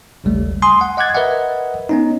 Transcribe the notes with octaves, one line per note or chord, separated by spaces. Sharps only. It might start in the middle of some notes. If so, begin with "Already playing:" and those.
A1 D#2 C#3 G3 A3
G#5 C6 D#6
F#5
D#5 F#5 D6 F#6 G#6 A6
A#4 B4 D#5 E5 F#5
B3 C#4 D#4